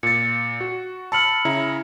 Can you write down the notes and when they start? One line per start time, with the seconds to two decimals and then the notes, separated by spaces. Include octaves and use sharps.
0.03 A#2 A6 C#7
0.61 F#4
1.12 A5 B5 E6 F6 C#7 F#7
1.45 C#3 E4 A#5